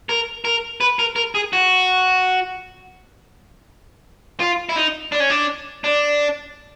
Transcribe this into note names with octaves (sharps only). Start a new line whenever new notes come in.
A#4
A#4
B4
A#4
A#4
G#4
F#4
F4
E4
D#4
D4
C#4
D4
D4